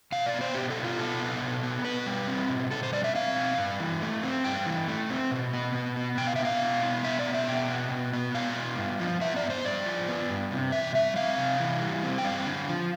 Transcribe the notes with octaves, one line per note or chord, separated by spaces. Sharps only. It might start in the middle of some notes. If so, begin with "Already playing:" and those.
B2 F5
D5
B3
C5
B2 G4
A4
B3
F4
B2 A4
B3
B2
B3
B2 B4
G3
C4
B2
B2 A4
C5
G3 D5
E5
C4 F5
B2
G2
E3
A3
C4
G2 G5
E3
A3
C4
B2
B3
B2
B3
B2 G5
F5
B3 E5
F5
B2
B3
B2 E5
D5
B3
E5
B2 G5
B3
B2
B3
B2 F5
B3
G2
F3
B3 E5
D5
G2
C5
G2 D5
F3
B3
G2
C3
E3 E5
G3 E5
C4 F5
C3
E3
G3
C4
G5
G2 F5
D3
F3